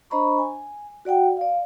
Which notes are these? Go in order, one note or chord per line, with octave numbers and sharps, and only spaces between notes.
D4 C5 D#5 A#5 B5 C#6
G#5
F#4 D5 F#5 G5
D5 F5